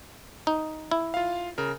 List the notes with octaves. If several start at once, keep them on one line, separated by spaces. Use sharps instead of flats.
D#4
E4
F4 F5
C#3 A#4